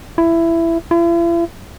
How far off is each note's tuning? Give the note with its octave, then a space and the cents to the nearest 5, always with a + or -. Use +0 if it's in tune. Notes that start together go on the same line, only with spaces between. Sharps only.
E4 +15
E4 +45